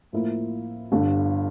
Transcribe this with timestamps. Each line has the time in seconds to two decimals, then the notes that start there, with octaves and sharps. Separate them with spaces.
0.12 A2 F3 A#3 E4
0.92 G1 G2 D3